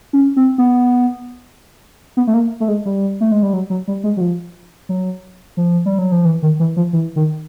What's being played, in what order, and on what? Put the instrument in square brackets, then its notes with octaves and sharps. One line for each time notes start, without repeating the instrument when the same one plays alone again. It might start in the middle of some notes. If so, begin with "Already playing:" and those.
[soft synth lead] C#4
C4
B3
B3
A3
A#3
A3
G#3
G3
A3
G#3
G3
F#3
F#3
G3
G#3
F#3
F3
F#3
F3
G3
F#3
F3
E3
D#3
E3
F3
E3
D#3